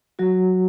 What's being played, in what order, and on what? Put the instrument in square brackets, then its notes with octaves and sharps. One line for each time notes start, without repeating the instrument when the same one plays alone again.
[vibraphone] F#3 F#4